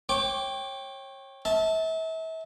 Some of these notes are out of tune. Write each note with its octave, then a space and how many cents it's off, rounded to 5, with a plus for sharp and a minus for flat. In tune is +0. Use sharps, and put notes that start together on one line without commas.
C#5 -30 G5 +0 D6 -20
E5 -35 A5 +0